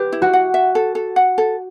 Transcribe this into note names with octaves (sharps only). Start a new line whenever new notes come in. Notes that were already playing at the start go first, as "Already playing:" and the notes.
Already playing: G4 B4
E4
F#4
F#5
E5
A4
A4
F#5
A4